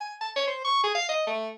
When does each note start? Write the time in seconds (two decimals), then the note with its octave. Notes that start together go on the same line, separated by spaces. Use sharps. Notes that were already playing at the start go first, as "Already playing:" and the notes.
0.01 G#5
0.21 A5
0.36 C#5
0.47 C5
0.65 C#6
0.83 G#4
0.95 F5
1.09 D#5
1.27 A3